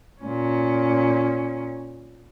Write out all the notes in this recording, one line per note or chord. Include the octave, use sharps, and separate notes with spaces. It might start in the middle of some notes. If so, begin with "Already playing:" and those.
A#2 C#4